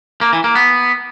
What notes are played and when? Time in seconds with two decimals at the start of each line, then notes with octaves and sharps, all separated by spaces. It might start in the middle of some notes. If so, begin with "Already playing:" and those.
0.21 A#3
0.33 E3
0.44 A#3
0.55 B3